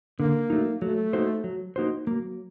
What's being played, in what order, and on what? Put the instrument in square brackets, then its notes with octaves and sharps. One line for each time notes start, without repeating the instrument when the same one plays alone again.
[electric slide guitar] D3 [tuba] A#3
[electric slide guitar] F#3 A3 D#4
[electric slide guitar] F#3 [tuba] A3
[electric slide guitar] A#3 D#4 F#4 C5
F#3
A#3 D#4 F#4 C5
[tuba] F#3 [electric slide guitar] A#3